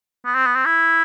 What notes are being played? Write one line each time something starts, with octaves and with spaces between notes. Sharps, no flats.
B3
C4
B3
C4
E4